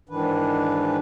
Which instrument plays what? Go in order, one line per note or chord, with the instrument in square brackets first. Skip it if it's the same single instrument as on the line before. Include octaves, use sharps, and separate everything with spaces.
[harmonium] G#2 D#3 E3 D4 B4